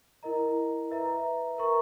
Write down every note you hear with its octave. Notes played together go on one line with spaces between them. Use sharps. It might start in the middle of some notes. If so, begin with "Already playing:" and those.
E4 A#4 D#5 A#5
B4 E5 A#5
A#4 E5 A#5 C#6